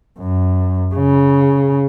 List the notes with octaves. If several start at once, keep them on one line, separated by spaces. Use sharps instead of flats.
F#2
C#3